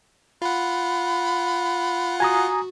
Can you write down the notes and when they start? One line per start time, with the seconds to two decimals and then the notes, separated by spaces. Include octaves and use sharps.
0.42 F4 F#5 B5
2.20 F#4 G#5 A#5 D#6